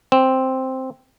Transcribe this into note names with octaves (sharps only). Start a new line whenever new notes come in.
C4